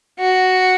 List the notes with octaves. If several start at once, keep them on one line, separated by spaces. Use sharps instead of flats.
F#4